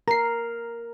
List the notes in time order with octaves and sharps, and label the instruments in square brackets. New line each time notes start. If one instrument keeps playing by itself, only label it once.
[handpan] A#4 [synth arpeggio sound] A#5 C7